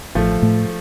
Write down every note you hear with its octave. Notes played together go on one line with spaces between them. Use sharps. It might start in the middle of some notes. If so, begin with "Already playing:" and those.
A1 F3 A3
A2 A3